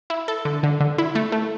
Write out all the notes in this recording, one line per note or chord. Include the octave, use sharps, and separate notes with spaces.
E4
A4
D3
D3
D3
E4
A3
A3